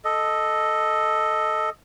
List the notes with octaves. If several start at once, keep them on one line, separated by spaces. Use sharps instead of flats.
A4 D#5